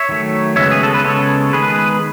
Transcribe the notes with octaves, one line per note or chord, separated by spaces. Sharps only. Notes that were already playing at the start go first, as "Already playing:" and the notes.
Already playing: C#5 E5
D#3 F#3 A3
C#3 G#3 B3 C#5 E5
G#4
A4
B4
C#3 G#3 B3 A4 C#5
D#3 G#3 B3 G#4 B4